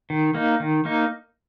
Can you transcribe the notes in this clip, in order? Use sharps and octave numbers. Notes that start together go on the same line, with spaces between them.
D#3
A#3 D#4
D#3
A#3 D#4